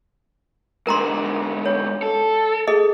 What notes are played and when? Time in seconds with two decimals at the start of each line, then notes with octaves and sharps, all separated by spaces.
0.87 G#2 D3 A#4 A#5 C6
1.66 C#5
2.02 A4
2.67 G#4 A4 D#5